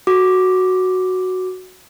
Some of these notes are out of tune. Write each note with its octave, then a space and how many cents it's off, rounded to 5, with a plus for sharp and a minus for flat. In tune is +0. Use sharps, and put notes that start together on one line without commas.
F#4 +0 D6 +0